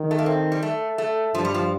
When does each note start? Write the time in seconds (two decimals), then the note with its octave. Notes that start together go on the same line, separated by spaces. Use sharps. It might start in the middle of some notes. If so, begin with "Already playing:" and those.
Already playing: D#3
0.11 A3
0.19 A#3
0.26 C4
0.52 G3
0.62 A3
0.98 A3
1.34 G2 F3
1.45 G3
1.54 F3